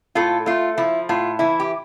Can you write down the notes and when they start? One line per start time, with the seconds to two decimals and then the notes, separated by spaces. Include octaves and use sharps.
0.15 A2 F4 A4
0.46 A3 F4
0.77 F3 E4
1.09 A2 F4
1.39 E3 E4
1.60 G4